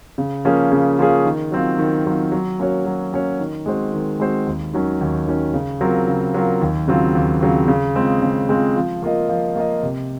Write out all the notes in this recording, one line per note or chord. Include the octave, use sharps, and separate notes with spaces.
C#3
F3 A#3 C#4 G#4
C#3
F3 A#3 C#4 G#4
D#3
F#3 C4 F4
D#3
F#3 C4 F4
F#3
A#3 C#4 F#4 C#5
F#3
A#3 C#4 F#4 C#5
D#3
G#3 C4 F#4 C5
D#3
G#3 C4 F#4 C5
D#2
D#3 F#3 C#4
D#2
D#3 F#3 C#4
C#3
F#3 C4 F4 A#4
C#3
F#3 C4 F4 A#4
D#2
C#3 F#3 C4 F4
D#2
C#3 F#3 C4 F4
C#3
G#3 C4 F4
C#3
G#3 C4 F4
F3
A#3 F4 A#4 D#5
F3
A#3 F4 A#4 D#5
C3